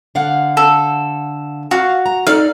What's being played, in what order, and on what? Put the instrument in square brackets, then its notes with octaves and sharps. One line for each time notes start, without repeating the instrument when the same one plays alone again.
[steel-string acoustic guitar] D3 F5 F#5
[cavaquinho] A4
[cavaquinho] F#4 [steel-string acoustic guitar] F5
[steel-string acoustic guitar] A#5
[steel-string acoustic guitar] D#4 A4 D5 [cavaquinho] F5